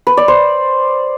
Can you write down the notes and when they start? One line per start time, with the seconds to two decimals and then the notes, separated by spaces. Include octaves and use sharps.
0.07 B4
0.17 D5
0.28 C5